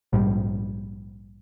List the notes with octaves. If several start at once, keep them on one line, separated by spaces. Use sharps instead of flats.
A#1 G#2 G3